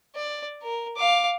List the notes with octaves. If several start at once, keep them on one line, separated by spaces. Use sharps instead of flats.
D5
A#4
F5 D6